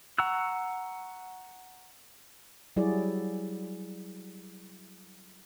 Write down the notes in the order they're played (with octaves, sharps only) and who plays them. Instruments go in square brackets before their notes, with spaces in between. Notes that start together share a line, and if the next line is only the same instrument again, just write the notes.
[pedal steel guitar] F#5 A#5 C#6 E6 F#6
[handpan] F#3 G3 E4 F#4 G#4 D5